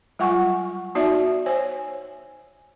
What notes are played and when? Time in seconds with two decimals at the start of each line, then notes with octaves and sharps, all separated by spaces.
0.19 F#3 G3 F4 F#5 G#5 C#6
0.95 B3 D#4 F#4 D5 E5 A5
1.46 C5 C#5 G#5